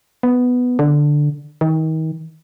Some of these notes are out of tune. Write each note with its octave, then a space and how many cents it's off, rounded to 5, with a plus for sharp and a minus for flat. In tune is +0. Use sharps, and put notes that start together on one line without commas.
B3 +5
D3 +5
D#3 +35